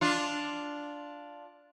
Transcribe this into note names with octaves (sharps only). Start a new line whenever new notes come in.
D4 F4